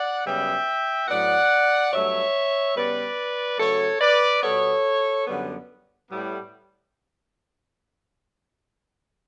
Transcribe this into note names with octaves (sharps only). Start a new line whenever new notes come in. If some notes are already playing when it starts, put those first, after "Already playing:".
Already playing: D5 F#5
F#2 C#3 G3 B3 E5 G5
A2 F#3 B3 D5 F#5
G2 F#3 A3 C#5 E5
C#3 G3 B3 B4 D5
C#3 F#3 A3 A4 C#5
B4 D5
B2 G3 B3 A4 C#5
F#2 D3 G3 B3
A2 G3 B3